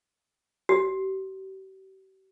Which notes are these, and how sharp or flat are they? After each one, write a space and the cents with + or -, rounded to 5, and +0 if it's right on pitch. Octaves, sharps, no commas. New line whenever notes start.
G4 -40